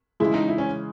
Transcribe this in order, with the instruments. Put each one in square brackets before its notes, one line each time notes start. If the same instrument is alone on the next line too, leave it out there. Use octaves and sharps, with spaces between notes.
[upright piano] C#3 E3 G#3 [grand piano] E4
[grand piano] D#4
E4
C#4